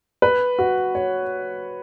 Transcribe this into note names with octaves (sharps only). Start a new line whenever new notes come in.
B4
F#4
C#5